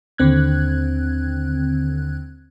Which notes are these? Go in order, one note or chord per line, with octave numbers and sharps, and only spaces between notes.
D#2 D3 C4 F#6 G#6